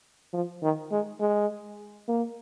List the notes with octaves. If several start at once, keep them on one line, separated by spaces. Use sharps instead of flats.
F3
D#3
G#3
G#3
A#3